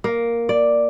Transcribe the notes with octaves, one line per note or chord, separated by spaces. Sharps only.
A#3
D5